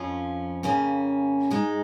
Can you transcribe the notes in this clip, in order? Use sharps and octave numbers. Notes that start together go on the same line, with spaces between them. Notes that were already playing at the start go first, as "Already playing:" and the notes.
Already playing: F2 F3 C#4 F4
F2 C#3 A#3 C#4
G#2 G#3 D#4